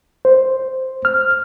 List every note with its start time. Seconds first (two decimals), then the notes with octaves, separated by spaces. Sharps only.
0.25 C5
1.05 F6